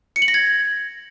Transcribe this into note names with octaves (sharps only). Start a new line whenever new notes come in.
C#7
F#7
A#6
G#6